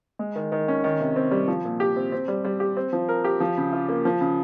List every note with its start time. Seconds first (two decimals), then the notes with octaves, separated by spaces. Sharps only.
0.19 G#3
0.36 D#3
0.52 D#3
0.68 C#4
0.84 D#3
1.00 C3
1.16 C4
1.31 G3
1.48 F3
1.65 A#2
1.80 G4
1.96 C4
2.12 C4
2.28 G3
2.45 G3
2.60 G4
2.77 C4
2.93 F3
3.09 A#4
3.25 G4
3.40 F3
3.58 C#3
3.73 F4
3.89 A#3
4.05 F3
4.21 C#3